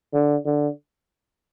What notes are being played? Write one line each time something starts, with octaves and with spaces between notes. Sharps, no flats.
D3
D3